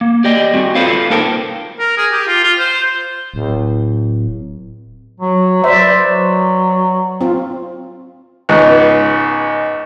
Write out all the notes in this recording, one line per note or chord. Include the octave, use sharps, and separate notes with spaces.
A#3
G4 D5 D#5 G5
G3 C4 F#4
F4 A4 B4 C5 F5
A#3 D#4 A4 A#4 G5
A#4
G#4
G4
F4
F4
C5
D1
F#3
C5 D5 E5
B4
F#3
C4 F4
C#2 G#2 B3